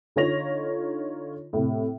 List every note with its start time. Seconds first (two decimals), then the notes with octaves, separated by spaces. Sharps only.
0.16 D3 D#4 F4 C#5 A#6 F7
1.53 A2 C3